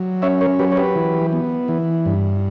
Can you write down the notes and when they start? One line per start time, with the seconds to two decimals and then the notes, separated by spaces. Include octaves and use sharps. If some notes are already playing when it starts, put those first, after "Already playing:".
Already playing: F#3
0.22 C#4 C#5 E5
0.41 A#4 C#5
0.59 F#3 G4 B4
0.72 C#5
0.77 G4 B4
0.96 E3
1.33 B3
1.68 E3
2.06 G2